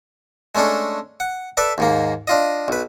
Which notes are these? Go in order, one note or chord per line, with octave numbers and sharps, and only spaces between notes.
G#3 A3 C#4 D4 A4
F#5
A4 B4 D5 E5 A5
D#2 G#2 A#3
D4 F4 D#5
B1 B4